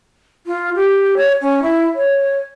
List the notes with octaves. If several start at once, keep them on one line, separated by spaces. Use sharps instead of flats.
F4
G4
C#5
C#4
E4
C#5